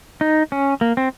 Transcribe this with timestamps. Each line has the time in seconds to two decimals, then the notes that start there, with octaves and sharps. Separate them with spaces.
0.21 D#4
0.52 C#4
0.81 A#3
0.97 C4